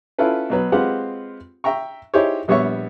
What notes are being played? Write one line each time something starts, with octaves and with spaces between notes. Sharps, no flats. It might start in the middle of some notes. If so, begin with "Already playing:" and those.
C#4 E4 F4 A4 B4
B2 F#3 B4
G#3 C4 F4 G4 B4 F#5
E5 G5 A#5 C#6
D#4 E4 G4 G#4 C5 C#5
A#1 G3 B3 C#5 E5 C#6